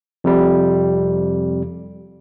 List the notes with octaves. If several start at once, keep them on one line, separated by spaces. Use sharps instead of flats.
F2 C3 G3